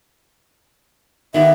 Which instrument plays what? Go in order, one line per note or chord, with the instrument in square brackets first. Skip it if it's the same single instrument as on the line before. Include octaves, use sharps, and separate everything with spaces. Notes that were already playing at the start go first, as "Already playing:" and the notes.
[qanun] D#3 B3 G4 [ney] E5